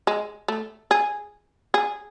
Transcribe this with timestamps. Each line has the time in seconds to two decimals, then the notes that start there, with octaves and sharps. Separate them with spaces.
0.07 G#3
0.48 A3
0.91 G#4
1.74 G#4